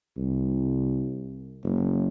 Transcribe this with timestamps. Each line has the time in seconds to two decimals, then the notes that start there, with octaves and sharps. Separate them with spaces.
0.16 C2
1.64 F#1